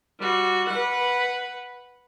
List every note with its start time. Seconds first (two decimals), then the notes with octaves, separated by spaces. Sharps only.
0.19 G3 F#4
0.69 B4 F#5